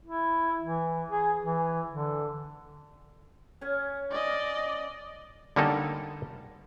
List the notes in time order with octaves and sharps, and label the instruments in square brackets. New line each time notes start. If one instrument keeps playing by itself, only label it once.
[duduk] E4
E3
G#4
E3
D3
[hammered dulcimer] C#4 G#5
[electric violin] D5 D#5
[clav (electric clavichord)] D3 G3 A#3 C#4 D#4 A4